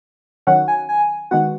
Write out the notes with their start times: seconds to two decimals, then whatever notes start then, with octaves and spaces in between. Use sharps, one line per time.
0.47 D#3 F#3 C#4 F#5
0.68 G#5
0.89 G#5
1.31 D#3 G#3 B3 F#4 F#5